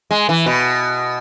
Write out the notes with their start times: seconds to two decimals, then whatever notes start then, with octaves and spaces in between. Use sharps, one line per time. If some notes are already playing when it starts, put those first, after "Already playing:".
0.11 G#3
0.29 E3
0.46 B2